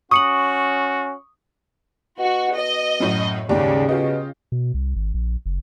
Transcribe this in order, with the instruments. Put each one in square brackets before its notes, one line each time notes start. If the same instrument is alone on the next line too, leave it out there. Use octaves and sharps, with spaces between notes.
[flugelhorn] C#4 [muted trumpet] F#4 [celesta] C#6 C#7 F#7 [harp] D#6
[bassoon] B2 [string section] F#4
[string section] D#5
[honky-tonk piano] F#2 A2 F#3
[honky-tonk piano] D#2 G#2 [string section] C#3 [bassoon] G3
[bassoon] B2 [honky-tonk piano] F4 G4 D#5
[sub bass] B2
C2
G#1
A#1
F#1